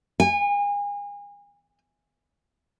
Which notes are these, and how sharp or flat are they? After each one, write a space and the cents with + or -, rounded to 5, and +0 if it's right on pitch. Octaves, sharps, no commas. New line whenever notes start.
G#5 -35